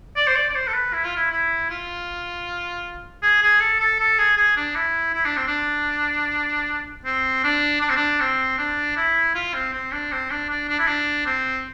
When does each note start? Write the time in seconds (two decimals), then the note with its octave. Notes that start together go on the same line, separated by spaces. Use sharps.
0.17 D5
0.27 C5
0.36 D5
0.50 D5
0.56 C5
0.68 A4
0.74 B4
0.93 E4
1.04 F4
1.16 E4
1.31 E4
1.70 F4
3.23 G#4
3.42 G#4
3.60 A4
3.80 A4
4.00 A4
4.19 G#4
4.37 G#4
4.56 D4
4.76 E4
5.14 E4
5.25 D4
5.37 C4
5.47 D4
7.05 C4
7.44 D4
7.81 D4
7.89 C4
7.96 D4
8.20 C4
8.58 D4
8.97 E4
9.35 F4
9.54 C4
9.73 C4
9.92 D4
10.12 C4
10.30 D4
10.49 D4
10.68 D4
10.79 E4
10.87 D4
11.26 C4